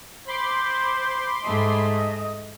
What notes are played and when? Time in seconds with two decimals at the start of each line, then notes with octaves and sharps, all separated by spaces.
0.27 C5 B5 C6 D6
1.44 G#2 A3 D#5